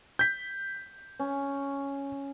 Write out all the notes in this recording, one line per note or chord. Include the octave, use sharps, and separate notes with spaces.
G6 B6
C#4